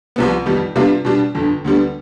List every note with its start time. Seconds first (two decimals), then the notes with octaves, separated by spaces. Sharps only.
0.16 C2 C3 F3 B3
0.46 F2 D#3 G3 B3 D#4
0.76 C3 G3 B3 D4 F4
1.05 B2 G3 D4
1.35 G1 F2 D3
1.65 D2 D3 G3 B3